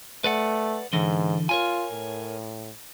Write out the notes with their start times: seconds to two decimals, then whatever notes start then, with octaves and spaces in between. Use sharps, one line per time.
0.24 A3 B4 D5 F#5
0.93 G#2 D3 E3
1.49 F4 A#4 C#5 G#5
1.92 A2